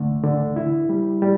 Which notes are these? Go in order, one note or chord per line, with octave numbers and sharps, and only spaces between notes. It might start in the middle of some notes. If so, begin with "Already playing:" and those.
Already playing: D2 D3 A3
D3
E4
G3
G3